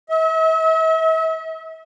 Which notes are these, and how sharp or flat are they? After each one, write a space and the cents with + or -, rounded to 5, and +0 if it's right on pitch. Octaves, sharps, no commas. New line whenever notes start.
E5 -40